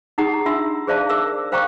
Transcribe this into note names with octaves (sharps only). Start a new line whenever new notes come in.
D#4 G4 G#4 F#5 A#5 D#6
D4 F4 E5 C6 E6
G#4 C5 D5 E5 F5 A5
A#4 E5 D6 E6
C5 F5 G5 A#5 C#6 D6